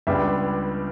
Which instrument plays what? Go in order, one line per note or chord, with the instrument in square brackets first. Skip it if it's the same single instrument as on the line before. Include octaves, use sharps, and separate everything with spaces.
[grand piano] C#2 C#3 G3 B3 D4 E5